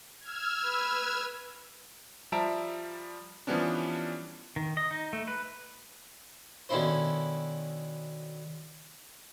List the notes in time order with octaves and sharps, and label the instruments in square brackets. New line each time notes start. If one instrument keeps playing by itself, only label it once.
[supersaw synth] E6 F6 G#6
[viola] B4
[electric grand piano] F3 G3 E5 A5 A#5 D7
E3 F3 G3 B3 C#4 D4
[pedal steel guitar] D#3
D#5
D#4
A3
B4
[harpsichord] B2 D3 D#3 C#4 E4 C5